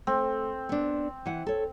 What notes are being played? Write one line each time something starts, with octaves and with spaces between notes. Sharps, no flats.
A3 C4
B3 D4
E3 F#5
A4 C#5